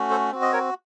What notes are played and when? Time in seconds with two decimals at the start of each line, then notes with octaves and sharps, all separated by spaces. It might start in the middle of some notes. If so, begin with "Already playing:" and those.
Already playing: A3 C#4 F#4
0.10 A4 C5
0.32 C4 F#4
0.42 D#5
0.52 A#4 C#5